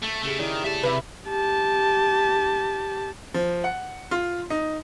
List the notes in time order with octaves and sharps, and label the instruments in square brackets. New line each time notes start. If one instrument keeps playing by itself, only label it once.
[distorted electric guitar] A3
[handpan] C#3 G4 G#4 [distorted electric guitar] A3 E4
[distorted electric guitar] D#3 [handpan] E4 C#5 D5
[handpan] G4 [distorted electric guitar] E5 A5
[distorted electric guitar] C3 [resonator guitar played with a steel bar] B4 E5
[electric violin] G4 A5
[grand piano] F3
F#5
F4
D#4